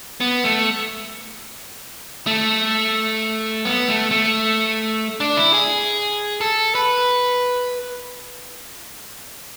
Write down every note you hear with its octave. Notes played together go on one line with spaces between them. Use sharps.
B3
A3
A3
B3
A3
A3
D4
E4
G#4
A4
B4